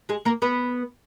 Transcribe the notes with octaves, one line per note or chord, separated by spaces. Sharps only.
G#3 G#4
A#3 A#4
B3 B4